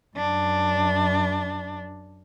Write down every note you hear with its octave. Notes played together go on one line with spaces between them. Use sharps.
F#2 D4